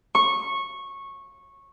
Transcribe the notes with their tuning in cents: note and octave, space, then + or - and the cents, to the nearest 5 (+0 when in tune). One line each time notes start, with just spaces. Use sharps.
C#6 -15